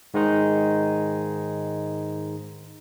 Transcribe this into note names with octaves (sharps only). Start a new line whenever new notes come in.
G#2 D#3 G#3 D#4